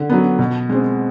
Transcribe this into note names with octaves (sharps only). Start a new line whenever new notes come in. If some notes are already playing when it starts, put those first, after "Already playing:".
Already playing: D3
F#3 B3
B2
G#3 C4